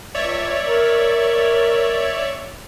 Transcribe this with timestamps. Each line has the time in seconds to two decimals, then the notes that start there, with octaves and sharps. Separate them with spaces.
0.14 C#2 C#5 D5 E5
0.67 A#4